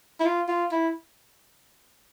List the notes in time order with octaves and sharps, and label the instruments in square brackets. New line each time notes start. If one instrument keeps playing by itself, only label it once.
[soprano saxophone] E4
F4
F4
E4